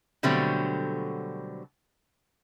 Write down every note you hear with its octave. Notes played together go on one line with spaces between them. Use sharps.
B2 D3 F#3 G3 A3 C4